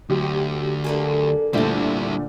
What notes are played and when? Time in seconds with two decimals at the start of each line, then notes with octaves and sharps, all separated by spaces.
0.10 D2 F#3 G4
0.84 D3 A#3 G#4
1.53 A#2 D3 G3 A3 E4 C5 A5